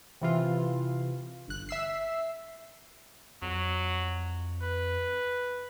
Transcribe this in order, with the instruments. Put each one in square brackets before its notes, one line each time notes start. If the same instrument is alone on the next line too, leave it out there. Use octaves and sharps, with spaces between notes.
[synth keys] C3 E3 F4
G1 F#6
E5 E6 C7
[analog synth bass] F2 [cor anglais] F#3
[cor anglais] B4